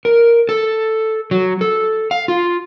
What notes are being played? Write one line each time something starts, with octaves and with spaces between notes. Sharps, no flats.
A#4
A4
F#3
A4
F5
F4